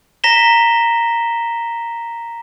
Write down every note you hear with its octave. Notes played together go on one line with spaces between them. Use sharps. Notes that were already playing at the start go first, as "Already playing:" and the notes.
A#5 A#6 B6 E7 G7